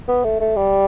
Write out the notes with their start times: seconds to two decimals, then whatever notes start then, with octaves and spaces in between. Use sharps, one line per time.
0.08 B3
0.24 A3
0.40 A3
0.56 G3